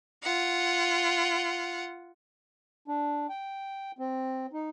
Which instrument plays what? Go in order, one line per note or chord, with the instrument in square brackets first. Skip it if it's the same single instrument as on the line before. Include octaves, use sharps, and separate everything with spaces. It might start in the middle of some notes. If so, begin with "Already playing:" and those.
[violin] F4 F#5
[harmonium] D4
G5
C4
D#4